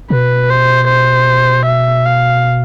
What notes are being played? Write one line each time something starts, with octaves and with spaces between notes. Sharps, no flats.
B2 B4
C5
C5
E5
F5